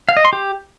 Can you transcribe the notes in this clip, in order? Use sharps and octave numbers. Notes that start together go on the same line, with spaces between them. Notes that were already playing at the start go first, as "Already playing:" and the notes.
F5
D#5
C6
G4